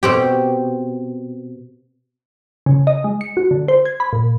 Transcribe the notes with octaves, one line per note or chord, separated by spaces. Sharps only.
B2 C4 G4
C#3
D#5
G#3
C#7
F#4
D3
C5
G#6
B5
A#2